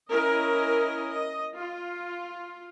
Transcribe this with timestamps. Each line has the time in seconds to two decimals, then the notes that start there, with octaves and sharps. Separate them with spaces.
0.11 C#4 E4 A#4 D#5
1.13 D#5
1.55 F4